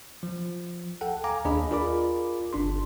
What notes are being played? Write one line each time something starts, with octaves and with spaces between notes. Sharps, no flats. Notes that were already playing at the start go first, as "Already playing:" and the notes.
F3
A4 F#5 G5
F5 G#5 A#5 D6
D#2 D4 G#4 D#5 B5
F4 G#4 A#4 D5 B5 D6
G1 D4 C6